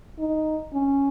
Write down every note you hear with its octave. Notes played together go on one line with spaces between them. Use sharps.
D#4
C#4